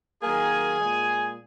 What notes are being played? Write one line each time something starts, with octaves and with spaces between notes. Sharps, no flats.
D#3 F#3 A#3 G#4 G#5
A#2 G#3